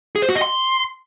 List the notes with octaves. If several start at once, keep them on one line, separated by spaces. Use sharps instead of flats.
G#4
C5
F#4
D#5
C6